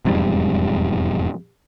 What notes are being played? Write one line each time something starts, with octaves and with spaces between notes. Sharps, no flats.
E1 F2 G#2 G3